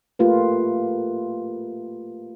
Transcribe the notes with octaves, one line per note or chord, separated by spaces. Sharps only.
A3 A#3 F4 G4 B4